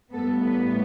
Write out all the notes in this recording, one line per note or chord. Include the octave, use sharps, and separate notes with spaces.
A2 G3 B3 A4
B4